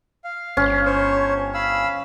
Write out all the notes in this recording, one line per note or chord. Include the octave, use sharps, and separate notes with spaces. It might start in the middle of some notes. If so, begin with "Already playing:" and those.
F5
G1 C#4
C5 C#5
F5 B5 E6